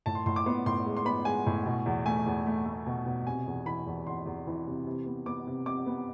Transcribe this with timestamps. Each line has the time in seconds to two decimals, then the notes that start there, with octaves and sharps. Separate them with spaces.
0.06 A2 A5
0.15 C6
0.26 A2 C6
0.36 D6
0.46 B3 C6
0.66 A2 C6
0.86 G#3
0.97 C6
1.05 B3 B5
1.25 G#3 G#5
1.46 A2
1.66 B2
1.86 E2
2.06 A3 G#5
2.26 E2
2.47 A3
2.65 A3
2.86 B2
3.06 B2
3.27 C3 G#5
3.46 E2
3.66 E3 B5
3.87 E2
4.07 E2 C6
4.26 E2
4.47 E3
4.67 C3
4.86 C3
5.06 B3
5.26 B3 D6
5.47 C3
5.66 C3 D6
5.86 B3